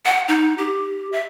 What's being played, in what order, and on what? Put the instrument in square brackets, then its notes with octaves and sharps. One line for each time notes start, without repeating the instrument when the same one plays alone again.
[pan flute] F#5
D#4
G4
E5